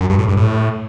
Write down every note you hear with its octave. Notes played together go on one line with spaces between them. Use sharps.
F#2
G2
A2
G2
A2